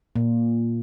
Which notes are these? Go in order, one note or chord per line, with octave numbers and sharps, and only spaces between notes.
A#2